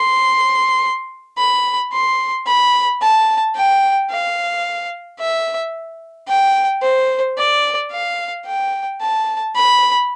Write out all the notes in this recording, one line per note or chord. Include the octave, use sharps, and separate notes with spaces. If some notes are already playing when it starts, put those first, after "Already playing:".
Already playing: C6
B5
C6
B5
A5
G5
F5
E5
G5
C5
D5
F5
G5
A5
B5